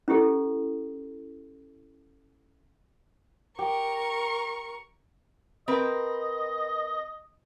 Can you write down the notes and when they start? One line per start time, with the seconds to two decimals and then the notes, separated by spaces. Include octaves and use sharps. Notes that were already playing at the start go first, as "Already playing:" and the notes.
0.08 C#4 E4 G4 A4
3.59 G4 A#4 C#6
5.68 C4 A#4 B4 D#5